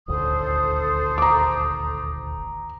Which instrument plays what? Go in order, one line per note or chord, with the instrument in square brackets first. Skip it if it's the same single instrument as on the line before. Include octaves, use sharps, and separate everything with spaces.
[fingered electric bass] D#1 G#1 D2 [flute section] A4 C5 D#6
[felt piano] A#5 D6